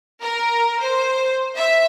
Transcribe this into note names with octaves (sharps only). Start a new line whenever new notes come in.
A#4
C5
E5